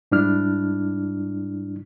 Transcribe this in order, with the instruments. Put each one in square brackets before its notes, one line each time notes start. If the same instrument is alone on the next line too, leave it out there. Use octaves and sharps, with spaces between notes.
[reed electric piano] G#2 G3 D4 E4 F6